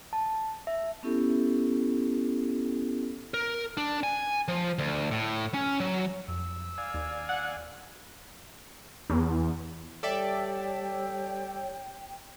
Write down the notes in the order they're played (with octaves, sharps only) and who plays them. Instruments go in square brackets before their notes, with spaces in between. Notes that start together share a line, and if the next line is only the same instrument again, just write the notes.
[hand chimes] A5
E5
[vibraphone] B3 C#4 E4 G4 A4
[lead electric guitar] A#4
D4
G#5
F3
D2
A2
C#4
F#3
[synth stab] F2 [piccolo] E6
[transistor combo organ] D5 F5 G#5
[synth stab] D#2
[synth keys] F#5
[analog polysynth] E2
[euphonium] G3 [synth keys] A4 D5 E5 [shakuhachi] C#5 [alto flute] G5